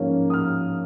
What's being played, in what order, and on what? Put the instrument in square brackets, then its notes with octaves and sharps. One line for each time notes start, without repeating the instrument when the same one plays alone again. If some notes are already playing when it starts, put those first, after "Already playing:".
Already playing: [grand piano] G#2 F3 A#3 C#4
D#6
F6